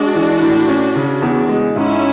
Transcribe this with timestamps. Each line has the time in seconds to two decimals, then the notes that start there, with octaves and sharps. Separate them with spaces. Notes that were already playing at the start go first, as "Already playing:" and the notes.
Already playing: G#3 D4 F#4
0.15 E3
0.42 A2
0.68 C#4
0.96 C#3
1.22 E2
1.49 G#3
1.76 G#2 C#4 E4